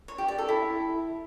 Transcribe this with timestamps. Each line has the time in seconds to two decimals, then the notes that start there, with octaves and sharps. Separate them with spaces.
0.08 C#5
0.18 G4
0.28 D5
0.38 A4
0.48 E4